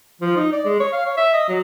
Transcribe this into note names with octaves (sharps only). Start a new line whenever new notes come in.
F3
D#4
D5
G#3
C#5
F5
C#5
E5
D#5
F#3